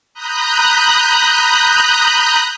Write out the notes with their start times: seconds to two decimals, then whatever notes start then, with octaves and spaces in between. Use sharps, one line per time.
0.14 A#5 B5 D#6 F#6 G6